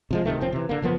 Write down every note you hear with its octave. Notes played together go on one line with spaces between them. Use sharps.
C3 F3 G#3
D1 C3 D#3 A3
F1 F3 C4 C#4
C3 E3
D3 A#3
F#1 F3 A#3 B3